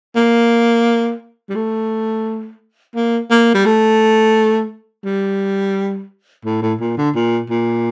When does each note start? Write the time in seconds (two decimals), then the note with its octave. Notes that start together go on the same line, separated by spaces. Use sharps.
0.15 A#3
1.49 G3
1.55 A3
2.95 A#3
3.30 A#3
3.55 G3
3.66 A3
5.05 G3
6.45 A2
6.62 A2
6.80 A#2
6.98 D3
7.15 A#2
7.50 A#2